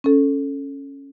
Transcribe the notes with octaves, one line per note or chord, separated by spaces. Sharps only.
C#4 A4